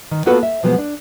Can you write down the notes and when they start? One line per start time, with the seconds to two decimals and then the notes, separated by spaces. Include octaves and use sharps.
0.11 D#3
0.26 A#3 B3 F4 F#4 A4 B4
0.43 E5
0.63 B2 F3 F#3 G#3 B3
0.78 D4